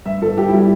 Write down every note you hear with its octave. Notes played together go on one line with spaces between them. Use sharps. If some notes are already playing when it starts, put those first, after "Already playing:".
G2 E5
G1 A4
G3 G4
E4
G3
G4